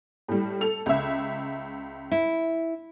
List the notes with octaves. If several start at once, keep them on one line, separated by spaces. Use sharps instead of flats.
A2 G3
A4 F7
C#2 E5
E4